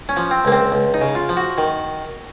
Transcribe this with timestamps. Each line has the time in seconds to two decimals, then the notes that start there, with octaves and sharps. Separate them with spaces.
0.09 C#4
0.17 F3
0.31 C4
0.45 C#2 A#3
0.52 C4
0.72 C#2
0.94 D#4
1.01 C#3
1.15 F4
1.29 F3
1.37 F#4
1.58 D#3